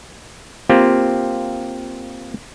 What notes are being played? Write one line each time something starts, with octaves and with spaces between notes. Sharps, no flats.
A#3 C4 F4 G4